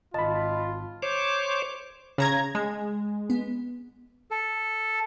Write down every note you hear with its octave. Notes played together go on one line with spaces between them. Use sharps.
G#1 F4 D#5 A5 B5
C5 C#5 D6
C#3 A#5 G#6
G#3 G#5
B3
A4